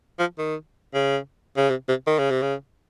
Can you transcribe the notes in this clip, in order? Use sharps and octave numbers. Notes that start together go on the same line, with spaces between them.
F3
D#3
C#3
C#3
C3
C3
D#3
C#3
C3
C#3